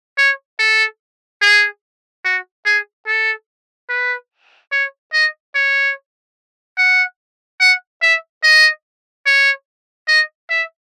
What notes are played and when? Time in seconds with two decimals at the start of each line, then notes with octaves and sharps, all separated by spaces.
0.18 C#5
0.59 A4
1.41 G#4
2.24 F#4
2.65 G#4
3.07 A4
3.89 B4
4.72 C#5
5.13 D#5
5.54 C#5
6.78 F#5
7.60 F#5
8.02 E5
8.43 D#5
9.25 C#5
10.08 D#5
10.50 E5